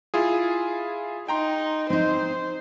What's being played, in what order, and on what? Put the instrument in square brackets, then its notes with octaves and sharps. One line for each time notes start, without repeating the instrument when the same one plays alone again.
[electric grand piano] E4 F4 G#4
[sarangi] D#4 [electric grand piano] G5 A#5 C6
[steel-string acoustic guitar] C4 D#4 [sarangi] C5